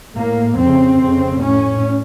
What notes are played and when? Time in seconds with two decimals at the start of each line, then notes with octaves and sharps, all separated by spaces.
0.16 A2 A#3
0.58 F2 C#3 C4
1.00 F2 C#3
1.42 A2 C#4